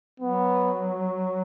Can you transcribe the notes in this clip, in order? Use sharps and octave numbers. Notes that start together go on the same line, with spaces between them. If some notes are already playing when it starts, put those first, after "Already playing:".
F#3 B3